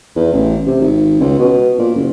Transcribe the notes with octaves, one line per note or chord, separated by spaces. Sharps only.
E2
A1
C3
G#1
C#2
B2
A#2
F#1